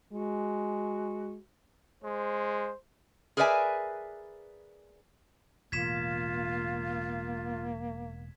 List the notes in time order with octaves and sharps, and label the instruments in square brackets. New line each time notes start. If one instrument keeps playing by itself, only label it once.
[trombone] G#3 [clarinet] F#4
[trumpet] G#3 [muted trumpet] C5
[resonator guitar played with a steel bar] G#4 A#4 B4 D5 E5 G#5
[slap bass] E1 A2 [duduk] A#3 [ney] F4 [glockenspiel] G#6 B6 E7